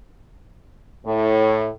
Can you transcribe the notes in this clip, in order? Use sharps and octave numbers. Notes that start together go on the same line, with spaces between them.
A2